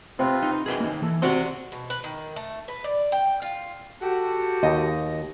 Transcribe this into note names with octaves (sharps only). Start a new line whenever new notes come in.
C3 C4 F4 B4
D#4
F#2 B2 E3 G#4 B4 G5
A#3 D#4
E3 A4
C3 F#4 D5 F#5 C6 C#6
B2
B4
D#3
A3
B4
D5
G5
F4
F#4 G4 A4
D#2 D#5